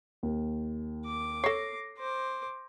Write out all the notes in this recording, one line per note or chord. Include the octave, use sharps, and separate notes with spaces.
D#2
D6
A4 C#5 A#6 C7
C5 D6